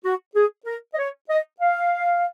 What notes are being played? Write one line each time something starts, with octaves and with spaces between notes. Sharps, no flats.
F#4
G#4
A#4
D#5
C#5
D#5
F5